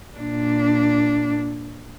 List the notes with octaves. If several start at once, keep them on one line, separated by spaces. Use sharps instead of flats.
A#2 D4